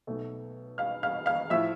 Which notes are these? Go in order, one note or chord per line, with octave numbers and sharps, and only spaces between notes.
B1 B2 A3
F5 F6
F5 F6
F5 F6
A2 F3 E5 E6